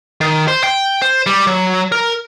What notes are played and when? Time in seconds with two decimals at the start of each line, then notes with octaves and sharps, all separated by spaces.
0.21 D#3
0.48 C5
0.64 G5
1.02 C5
1.26 G3
1.47 F#3
1.92 A#4